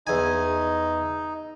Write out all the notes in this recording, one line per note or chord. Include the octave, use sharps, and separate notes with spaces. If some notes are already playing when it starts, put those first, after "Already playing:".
E2 D#4 G#5